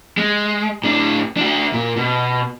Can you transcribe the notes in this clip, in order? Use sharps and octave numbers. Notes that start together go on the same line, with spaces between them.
G#3
A2 D4
D4 F#4
A#2
B2